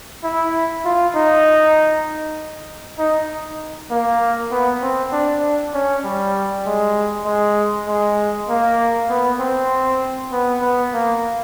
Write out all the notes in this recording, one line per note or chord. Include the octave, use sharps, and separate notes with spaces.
E4
F4
D#4
D#4
A#3
B3
C4
D4
C#4
G3
G#3
G#3
G#3
A#3
B3
C4
B3
B3
A#3